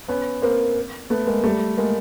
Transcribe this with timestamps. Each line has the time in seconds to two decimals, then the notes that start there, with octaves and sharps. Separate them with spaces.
0.08 B3 C#4
0.42 A#3 C4
1.10 A3 B3
1.27 G#3 A#3
1.44 G3 A3
1.77 G#3 A#3